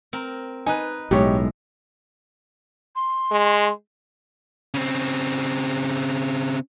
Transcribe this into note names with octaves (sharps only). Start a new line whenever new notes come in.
C4 A#4
D#4 B4 G#5
B1 A2 G#3 G4 C#5
C6
G#3
C#3 C4